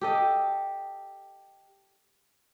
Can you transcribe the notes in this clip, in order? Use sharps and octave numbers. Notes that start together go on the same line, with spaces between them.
G4 A4 D#5